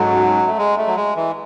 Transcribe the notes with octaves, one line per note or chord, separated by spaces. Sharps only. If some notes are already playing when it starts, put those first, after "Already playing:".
Already playing: G#2 F#3 G#3 C#4 F#4 A4
A3
G#3
A3
F#3
G#3
E3